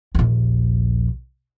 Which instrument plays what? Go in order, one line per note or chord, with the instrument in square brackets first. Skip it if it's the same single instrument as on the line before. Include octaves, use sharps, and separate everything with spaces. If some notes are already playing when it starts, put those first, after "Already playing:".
[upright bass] A#1 D#2